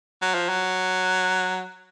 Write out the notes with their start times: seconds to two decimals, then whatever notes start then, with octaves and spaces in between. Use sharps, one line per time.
0.22 F#3
0.34 F3
0.49 F#3